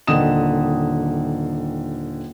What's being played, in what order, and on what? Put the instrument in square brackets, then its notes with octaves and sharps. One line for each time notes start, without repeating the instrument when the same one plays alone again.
[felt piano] D#1 D3 D#3 D#6 E7